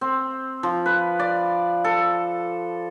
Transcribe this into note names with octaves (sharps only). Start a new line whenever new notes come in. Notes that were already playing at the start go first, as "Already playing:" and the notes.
C4
F3
B4
D5
A4